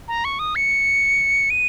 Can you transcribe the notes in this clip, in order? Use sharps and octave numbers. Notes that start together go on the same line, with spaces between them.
A#5
C#6
D#6
C#7
D#7